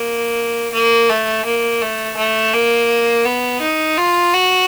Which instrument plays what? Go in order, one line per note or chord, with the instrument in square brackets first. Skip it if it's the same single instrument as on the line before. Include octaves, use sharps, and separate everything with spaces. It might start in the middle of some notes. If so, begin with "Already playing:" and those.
Already playing: [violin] A#3
A#3
A3
A#3
A3
A3
A#3
B3
D#4
F4
F#4